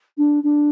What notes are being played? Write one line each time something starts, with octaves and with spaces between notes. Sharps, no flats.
D4
D4